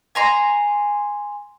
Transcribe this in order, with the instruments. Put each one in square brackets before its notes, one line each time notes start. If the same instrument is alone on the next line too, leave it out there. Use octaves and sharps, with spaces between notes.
[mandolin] G#5 A#5 C6